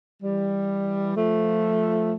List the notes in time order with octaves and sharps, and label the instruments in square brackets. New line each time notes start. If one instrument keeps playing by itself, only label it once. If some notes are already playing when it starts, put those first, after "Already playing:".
[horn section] E3 G3
F3 A3